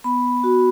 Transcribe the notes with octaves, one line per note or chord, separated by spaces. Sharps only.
B3 B5
F#4